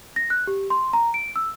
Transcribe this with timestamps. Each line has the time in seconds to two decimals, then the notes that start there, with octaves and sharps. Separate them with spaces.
0.16 A#6
0.30 F#6
0.47 G4
0.70 C6
0.93 A#5
1.14 D7
1.36 E6